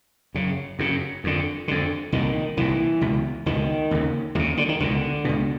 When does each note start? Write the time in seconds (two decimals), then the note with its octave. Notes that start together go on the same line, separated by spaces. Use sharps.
0.35 F#2 C#3
0.79 F#2 C#3
1.24 F2 D3
1.68 F2 D3
2.12 C2 A#2 D#3
2.57 C2 A#2 E3
3.01 C#2 B2
3.46 C#2 B2 D#3
3.91 D#2 C#3
4.35 D#2 D#3
4.39 C#3
4.57 D3
4.69 D#3
4.80 C#2 B2 D3
5.25 C#2 B2